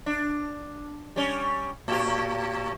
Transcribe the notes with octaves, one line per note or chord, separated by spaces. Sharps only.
D4
G3 C#4
A2 G4